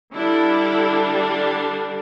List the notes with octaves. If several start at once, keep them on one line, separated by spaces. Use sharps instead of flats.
D3 G3 D4 E4